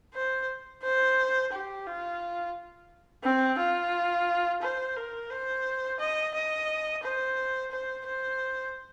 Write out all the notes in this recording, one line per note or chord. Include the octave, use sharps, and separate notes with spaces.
C5
C5
G4
F4
C4
F4
C5
A#4
C5
D#5
D#5
C5
C5
C5